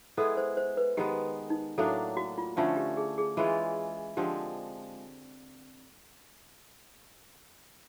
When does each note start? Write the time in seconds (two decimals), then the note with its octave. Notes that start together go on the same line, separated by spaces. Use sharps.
0.17 G#3 B3 E4 G#4 A4
0.37 C5
0.57 C5
0.77 B4
0.97 D#3 G#3 B3 G4
1.50 D#4
1.78 A2 F#3 A#3 D4 A4
2.17 F#4
2.38 F4
2.57 D3 F3 A3 C#4 F4
2.77 G4
2.97 G#4
3.18 G#4
3.37 E3 G#3 C#4 F4 G#4
4.17 D3 F3 G#3 C4 G4